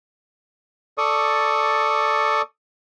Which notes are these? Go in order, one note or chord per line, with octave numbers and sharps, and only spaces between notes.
A4 D5 C#6 D#6